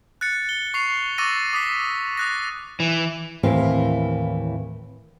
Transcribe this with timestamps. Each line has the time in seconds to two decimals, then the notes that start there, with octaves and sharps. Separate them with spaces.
0.21 F#6 A6 C#7
0.49 G7
0.74 C#6 C7 F7
1.18 C#6 D6 E6 A6 A#6 D#7
1.53 D6 D#6 A#6 B6
2.17 D#6 F#6 A#6
2.80 E3
3.43 D#2 A2 E3 C4 A#4 F5